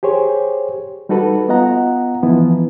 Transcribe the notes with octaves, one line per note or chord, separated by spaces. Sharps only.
G4 G#4 C5 C#5
G3 D#4 F#4 A4 B4
B3 F4 D#5 F#5 A#5
E3 F3 B3 E4